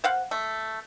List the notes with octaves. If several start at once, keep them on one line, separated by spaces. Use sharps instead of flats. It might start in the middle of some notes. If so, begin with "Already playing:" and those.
C5 F5 F#5
A3